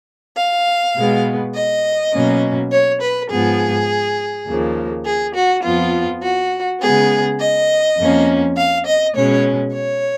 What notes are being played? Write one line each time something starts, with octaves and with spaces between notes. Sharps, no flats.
F5
B2 G#3 B3
D#5
B2 F#3 A#3 C#4
C#5
B4
G#2 F3 B3 G#4
D#2 C#3 F3 A#3
G#4
F#4
F2 F3 B3 F4
F#4
C#3 G#3 B3 G#4
D#5
F2 F3 A#3 C#4
F5
D#5
B2 G#3 C#4 C#5
C#5